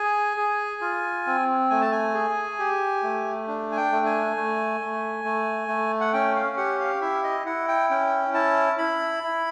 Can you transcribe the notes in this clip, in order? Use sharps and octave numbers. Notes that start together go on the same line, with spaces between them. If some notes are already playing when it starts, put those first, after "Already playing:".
Already playing: G#4 G#5
G#4
F4
C4
A3 G#5
A5
G#5
G#4
G4
A3
D4
G#5
G5
A3
G#5
A3
A3
A3
A3
F#5
C#4 G5
F5
G4 F#5
F5
E4 E5
D#5
E4 F#5
G5
C#4 G5
E4 A5
E4 B5
E4